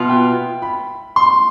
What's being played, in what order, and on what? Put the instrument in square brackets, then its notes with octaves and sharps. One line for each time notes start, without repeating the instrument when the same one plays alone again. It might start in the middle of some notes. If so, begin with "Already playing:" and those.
Already playing: [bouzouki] B2 B3 F4 [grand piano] E5
[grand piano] G5
B5
C6